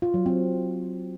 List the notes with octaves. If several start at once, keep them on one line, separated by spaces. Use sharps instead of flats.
F4
F#3
C4